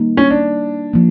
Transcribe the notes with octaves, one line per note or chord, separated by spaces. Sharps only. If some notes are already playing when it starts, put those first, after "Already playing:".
Already playing: D#3 G3 A#3 D#4
C#4
D4
F3 A#3